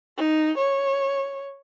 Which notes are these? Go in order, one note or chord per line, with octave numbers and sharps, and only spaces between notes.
D#4
C#5